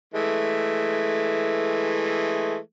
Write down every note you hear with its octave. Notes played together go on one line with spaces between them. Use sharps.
E3 G#3 A3